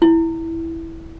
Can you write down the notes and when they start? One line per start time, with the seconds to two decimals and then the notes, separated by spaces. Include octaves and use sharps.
0.02 E4